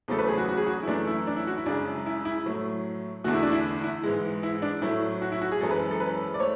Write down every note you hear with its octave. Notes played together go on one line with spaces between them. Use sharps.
E2 C#3 F#3 A3 A4
B4
G#4
F#4
F#4
G#4
F#4
E4
F#2 E3 A3 D4
E4
D4
E4
F#4
E4
F#2 C#3 G#3 D4
E4
E4
A2 F#3 A3
E2 D3 A3 F#4
E4
D4
E4
E4
G#2 E3 G#3
E4
D4
A2 F#3 A3 E4
F#4
E4
F#4
G#4
F#2 E3 G#3 A4
B4
A4
B4
D5
A3 C#5